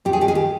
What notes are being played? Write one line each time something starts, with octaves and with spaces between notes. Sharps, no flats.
G2 G4
G#4
D#3 G4
G#4
G4